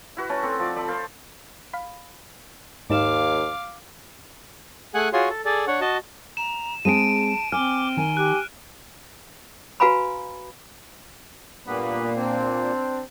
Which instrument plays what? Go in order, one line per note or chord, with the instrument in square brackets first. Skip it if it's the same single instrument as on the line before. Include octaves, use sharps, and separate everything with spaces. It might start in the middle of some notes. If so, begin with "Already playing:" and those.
[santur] E4 F#4 B4
A3 C#4 A4
C4 A4
F3 D5
A4 D5 B5 E6
A4 C5 F5
[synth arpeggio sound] F5 B5
[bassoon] D#2 [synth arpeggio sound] G#2 D#4 E7 [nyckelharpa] F5 D6
[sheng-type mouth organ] A3 G#4 F#5 G#5 F#6
F4 F#4 G#4 C#5 C6
A4
G#4 A4 D5
D4 C#5 F#5
F#4 D#5 A5
[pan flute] A#5 [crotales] E7
[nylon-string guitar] G#3 C4 G#4 [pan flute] A5 [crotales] D7 D#7
[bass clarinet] C4 [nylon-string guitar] G#5 [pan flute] D6 [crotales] F6
[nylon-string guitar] D#3 [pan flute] G#5
[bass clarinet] G4 [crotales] F#6
[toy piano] F#4 B4 F5 G#5 A#5 B5
[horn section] G2 B3 B4 [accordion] A#2 A#3
[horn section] C4 D4